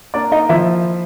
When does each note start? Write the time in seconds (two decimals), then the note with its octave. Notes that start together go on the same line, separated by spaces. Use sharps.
0.14 A#3 D4 D5
0.32 D#4 D#5
0.49 F3 E4 E5